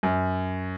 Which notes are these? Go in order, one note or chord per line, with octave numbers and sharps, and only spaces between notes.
F#2